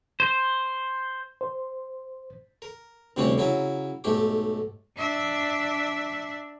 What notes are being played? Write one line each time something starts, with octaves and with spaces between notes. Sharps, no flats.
C5
C5
A#4
D2 C3 E3 G3 C4 C#4
C#3 F#3 E4 A#4
B1 G#2 A3 G4 D6
D4 E5